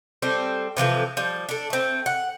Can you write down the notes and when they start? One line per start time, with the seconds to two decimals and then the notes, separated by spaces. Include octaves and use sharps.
0.22 G3 C4 A4
0.77 C3 E3 F3 A4
1.17 F3 G3
1.49 D4 A4
1.70 A3 C4
2.06 F#5